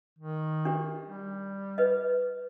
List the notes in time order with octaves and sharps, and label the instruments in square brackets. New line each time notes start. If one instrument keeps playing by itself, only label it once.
[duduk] D#3
[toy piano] D4 G4
[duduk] G3
[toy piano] B4 D#5